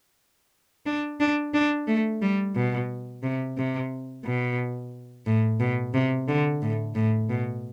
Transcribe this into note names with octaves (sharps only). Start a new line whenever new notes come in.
D4
D4
D4
A3
G3
B2
C3
C3
B2
A2
B2
C3
D3
A2
A2
B2